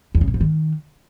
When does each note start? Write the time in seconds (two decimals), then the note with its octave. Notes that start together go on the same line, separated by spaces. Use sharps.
0.15 E2
0.21 C#3
0.28 A#2
0.34 G#2
0.41 D#3